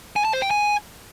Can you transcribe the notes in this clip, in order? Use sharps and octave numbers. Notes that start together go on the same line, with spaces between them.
G#5
A5
C5
G5
G#5